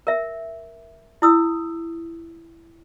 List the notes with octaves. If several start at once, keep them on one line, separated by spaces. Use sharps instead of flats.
A#4 E5
E4 D#6 E6